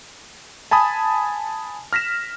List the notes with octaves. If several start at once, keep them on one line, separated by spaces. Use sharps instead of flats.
G#5 A5 B5 D#6
F6 A#6 B6 E7